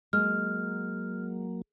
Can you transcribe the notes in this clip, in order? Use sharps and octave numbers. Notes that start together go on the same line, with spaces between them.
F#3 G#3 A#3 F6